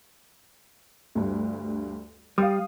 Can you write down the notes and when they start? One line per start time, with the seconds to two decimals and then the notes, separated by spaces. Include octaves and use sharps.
1.15 D2 G2
2.38 G3 F5 D#6